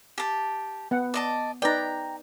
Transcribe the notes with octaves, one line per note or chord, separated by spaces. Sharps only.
G4 A5
B3 F#5
D5 D#5 A5
D#4 B4 D5 G5 A#5